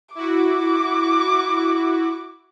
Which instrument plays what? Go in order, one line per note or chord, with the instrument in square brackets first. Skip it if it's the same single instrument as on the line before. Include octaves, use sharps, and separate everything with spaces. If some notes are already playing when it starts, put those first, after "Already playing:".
[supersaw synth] E4 F#4 [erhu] D6